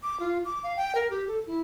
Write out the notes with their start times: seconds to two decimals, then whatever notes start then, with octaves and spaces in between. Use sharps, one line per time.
0.03 D6
0.20 F4
0.45 D6
0.64 F5
0.77 G5
0.95 A#4
1.10 G4
1.28 A4
1.47 E4